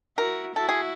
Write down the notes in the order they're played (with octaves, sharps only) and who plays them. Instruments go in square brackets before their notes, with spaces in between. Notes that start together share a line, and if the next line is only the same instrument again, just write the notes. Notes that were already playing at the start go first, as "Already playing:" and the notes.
[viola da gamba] E4 F#4 [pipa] A#4
[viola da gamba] E4 F#4 [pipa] A4
[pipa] G#4